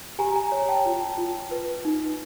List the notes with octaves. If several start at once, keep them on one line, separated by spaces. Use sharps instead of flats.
G4 G#5 A#5
G#5 A#5
C#5
G5 A5
F4
F4
B4
D#4